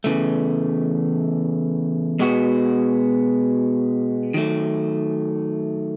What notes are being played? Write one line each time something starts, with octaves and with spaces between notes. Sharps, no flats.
E2 C#3 E3 A3
B2 G#3 B3 F#4
D#3 F#3 A3